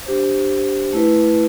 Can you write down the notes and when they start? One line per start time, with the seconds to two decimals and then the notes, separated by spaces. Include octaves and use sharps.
0.06 D4 G4 C5
0.93 A3 E4 B4